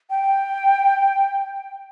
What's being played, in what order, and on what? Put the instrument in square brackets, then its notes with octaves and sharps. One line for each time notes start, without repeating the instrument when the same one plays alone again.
[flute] G5